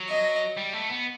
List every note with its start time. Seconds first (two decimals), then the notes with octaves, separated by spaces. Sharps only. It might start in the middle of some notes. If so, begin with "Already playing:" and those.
Already playing: F#3
0.10 D#5
0.57 G3
0.73 A3
0.89 B3